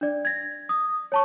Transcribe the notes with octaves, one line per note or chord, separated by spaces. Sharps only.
D4 D5
G#6 A#6
D#6
C#5 A5 C#6